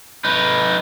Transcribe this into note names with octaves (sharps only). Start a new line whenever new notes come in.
D#4 B4